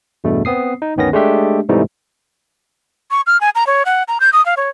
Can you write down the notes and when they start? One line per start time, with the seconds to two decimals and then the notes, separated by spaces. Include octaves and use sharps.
0.24 E2 G2 B2 A3
0.45 B3 C4 D#6 C7
0.82 D#4
0.96 G1 D2 D#3 B3 C#4 A#6
1.13 G#3 A3 D4 G4 E5
1.69 G#2 C3 E3 G3 A3 D#4
3.11 C#6
3.27 F6
3.41 G#5
3.55 A#5
3.67 C#5
3.85 F#5
4.08 A#5
4.20 G6
4.33 D#6
4.46 F5
4.57 C#5